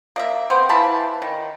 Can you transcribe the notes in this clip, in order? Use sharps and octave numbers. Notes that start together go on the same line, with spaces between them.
A#3 D#5 E5
B3 C4 C5
E3 F5 A5 B5
D#3